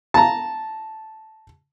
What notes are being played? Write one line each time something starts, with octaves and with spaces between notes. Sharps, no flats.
A5 A#5